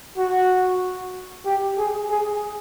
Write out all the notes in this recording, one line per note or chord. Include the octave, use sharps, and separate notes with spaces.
F#4
G4
G#4
G#4